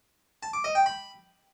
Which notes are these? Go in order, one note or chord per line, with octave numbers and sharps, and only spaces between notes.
A5
D6
D#5
G5
B5